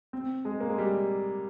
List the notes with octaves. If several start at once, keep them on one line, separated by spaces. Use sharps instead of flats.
C4
G#3
A#3
G#3
G3